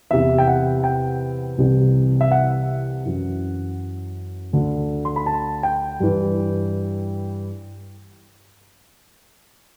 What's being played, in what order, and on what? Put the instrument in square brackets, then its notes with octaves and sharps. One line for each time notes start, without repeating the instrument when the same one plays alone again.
[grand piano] E2 C3 E3 E5
G5
F#5
G5
C2 C3 E3
E5
F#5
F#2 E3
D2 D3
C6
B5
A5
G5
G2 E3